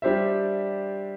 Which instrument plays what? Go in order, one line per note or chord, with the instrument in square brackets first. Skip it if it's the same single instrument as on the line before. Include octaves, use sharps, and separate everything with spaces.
[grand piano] G3 D4 G4 C5 E5